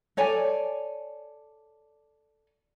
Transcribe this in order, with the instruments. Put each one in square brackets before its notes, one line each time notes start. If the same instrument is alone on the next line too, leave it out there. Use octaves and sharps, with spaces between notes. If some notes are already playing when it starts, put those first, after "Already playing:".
[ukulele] A4 C#5 D5 G#5